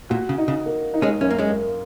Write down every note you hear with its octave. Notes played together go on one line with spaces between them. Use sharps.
A#2 F#4
C#3
D#4
C#3
A#3
D#4
G#3 C#4
F#2 C#4
A#3
G#3 C#4
A#3